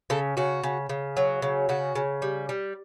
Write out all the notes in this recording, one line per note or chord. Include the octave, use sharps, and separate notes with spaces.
C#3 A4
C#3 F#4
C#3
C#3
F#3
C#3
C#3 F#4
C#3
G3
G3